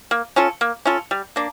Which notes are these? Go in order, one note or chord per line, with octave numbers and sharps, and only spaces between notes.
A#3
C#4 F4 A4
A#3
C#4 F4 A4
G3
A#3 D4